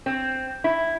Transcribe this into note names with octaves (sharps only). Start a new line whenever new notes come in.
C4
E4